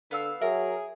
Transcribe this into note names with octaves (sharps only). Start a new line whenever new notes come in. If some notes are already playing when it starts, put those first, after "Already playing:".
D3 B3 F5 E6
F#3 G#4 A#4 E5